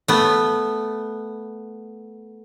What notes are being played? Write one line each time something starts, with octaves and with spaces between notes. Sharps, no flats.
A3 B3